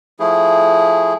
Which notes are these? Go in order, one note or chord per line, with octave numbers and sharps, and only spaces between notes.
F3 A3 E4 G#4